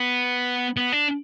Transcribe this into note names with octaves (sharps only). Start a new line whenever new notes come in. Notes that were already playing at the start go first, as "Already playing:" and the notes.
Already playing: B3
B3
D4